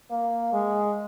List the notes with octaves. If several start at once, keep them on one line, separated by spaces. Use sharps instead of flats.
A#3
G#3